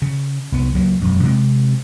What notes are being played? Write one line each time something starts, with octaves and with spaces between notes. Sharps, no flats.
C#3
C2 B3
C#2 F#3 A#3
E1 F#2
C3 G#3 A#3 C4